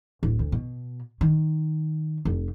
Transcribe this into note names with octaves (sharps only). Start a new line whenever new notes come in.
D1
D2
B2
D#3
F1